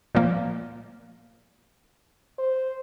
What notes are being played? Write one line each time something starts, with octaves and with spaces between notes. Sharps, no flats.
A#2 F3 A#3
C5